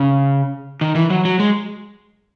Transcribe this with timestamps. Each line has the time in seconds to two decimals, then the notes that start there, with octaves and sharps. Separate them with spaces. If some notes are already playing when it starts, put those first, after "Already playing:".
Already playing: C#3
0.81 D#3
0.95 E3
1.10 F#3
1.25 F#3
1.40 G#3